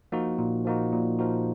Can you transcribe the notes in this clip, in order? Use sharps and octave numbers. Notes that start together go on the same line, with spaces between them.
F3 A#3 D#4 F#4
A#2
F3 A#3 D#4 F#4
A#2
F3 A#3 D#4 F#4